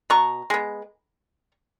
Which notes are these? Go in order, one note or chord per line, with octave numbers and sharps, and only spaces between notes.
B2 A#5 C#6
G#3 B3